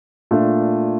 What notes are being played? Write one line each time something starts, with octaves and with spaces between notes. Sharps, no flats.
A#2 A3 D4 F4